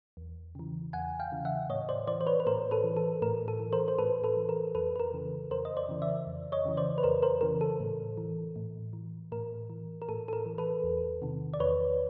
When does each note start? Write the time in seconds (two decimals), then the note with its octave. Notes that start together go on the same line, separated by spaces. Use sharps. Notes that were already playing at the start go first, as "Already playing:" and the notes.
0.17 E2
0.55 C#3 E3
0.93 E2 F#5 G#5
1.20 F5 G5
1.32 C#3 E3
1.45 E5 F#5
1.69 A2 C#5 D#5
1.89 C5 D5
2.08 E3 C5 D5
2.21 C5
2.27 B4 C#5
2.40 B4
2.46 A2 A#4 C5
2.71 A4 B4
2.84 E3
2.97 A4
3.22 A2 A#4
3.48 A4
3.60 E3
3.73 A#4 C5
3.88 C5
3.98 A2 A4 B4
4.24 A4 B4
4.37 E3
4.49 A#4
4.75 F2 A4 B4
4.96 B4
5.00 A#4
5.13 C#3 E3
5.50 F2 A#4 C5
5.65 D#5
5.77 C5 D5
5.89 C#3 E3
6.02 D5 E5
6.27 F2
6.52 C#5 D#5
6.65 C#3 E3
6.77 C5 D5
6.98 B4
7.03 F2 A#4 C5
7.22 A#4 C5
7.41 C#3 E3 A#4
7.61 A4
7.80 A2
8.18 E3
8.56 A2
8.93 E3
9.32 A2 A#4
9.70 E3
10.02 A#4
10.09 A2 A4
10.28 A4
10.33 A#4
10.46 E3
10.58 A4 B4
10.84 E2
11.22 C3 D#3
11.54 D5
11.60 E2 B4 C#5